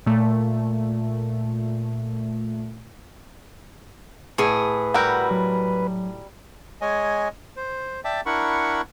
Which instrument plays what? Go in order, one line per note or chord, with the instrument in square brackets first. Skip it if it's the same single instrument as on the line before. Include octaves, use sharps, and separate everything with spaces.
[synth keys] A#2 A3
[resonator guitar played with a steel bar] A2 G#4 [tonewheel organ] B4
[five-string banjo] G3 F#4 A#4 [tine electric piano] F#5 E6 G6
[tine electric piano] F#3
[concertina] G#3 C#5 D#5 G#5
C5
D5 E5 G5 A5 D6
D4 E4 A#4 F#5 B5 C#6